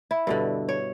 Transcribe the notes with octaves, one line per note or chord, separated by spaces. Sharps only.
E4
G2 B2 D3
C#5